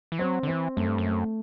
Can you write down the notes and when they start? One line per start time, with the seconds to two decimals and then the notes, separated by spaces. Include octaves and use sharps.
0.12 E3
0.19 F#3 C4
0.43 D3
0.47 E3 C4
0.76 F#2 A3
0.88 G2
0.98 F#2
1.06 A3